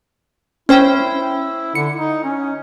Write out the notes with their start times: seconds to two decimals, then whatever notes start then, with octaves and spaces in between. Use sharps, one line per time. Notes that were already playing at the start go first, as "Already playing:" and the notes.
0.69 C#4 E4 C5 G5
1.75 D3 C#7
1.96 D#4
2.24 C#4